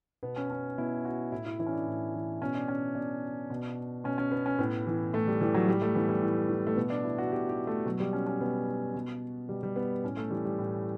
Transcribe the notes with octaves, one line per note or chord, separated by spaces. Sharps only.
B2 B3
C#4
C#4
B2 E4
F#4
A2 E4
E4
E3 E4
C#4
D4
A2
E3
B2 C#4
D4
C#4
B2 D4
B2
B2 C#4
C#4
B3
C#4
A2 B3
E3
A2 A3
G3
E3 G3
F#3
A2 G3
A3
E3 B3
G3
A2
E3
A3
B2 B3
D4
E4
F#4
B2 G4
G4
A3
B2 F#3
G3
C#4
C#4
B2 B3
B2
B2 G3
G3
B3
A2 C#4
A3
E3 G3
G3
A2